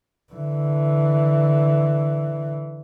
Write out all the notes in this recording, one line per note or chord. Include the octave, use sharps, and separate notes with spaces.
D3 E3